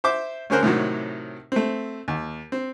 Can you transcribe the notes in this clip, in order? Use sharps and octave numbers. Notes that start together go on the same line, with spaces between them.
C5 E5 D6
D2 C#4 G#4 A#4 C5 F#6
A2 C3 D#3 F#3
A3 C4
D#2
C4